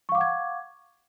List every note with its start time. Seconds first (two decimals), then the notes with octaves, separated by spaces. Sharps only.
0.09 C#6
0.12 F5
0.15 D6
0.18 F#5
0.21 G#6